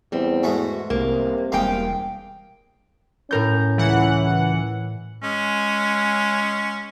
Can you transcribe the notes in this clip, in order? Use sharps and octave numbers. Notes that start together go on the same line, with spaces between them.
E2 G3 C4
G#2 G#3 A3 F#4
C2 C3 A#3
E1 G2 G#3 A#3 F5 G5
A2 C#4 A#4 G6
C#2 E3 F#5
G#3 C#4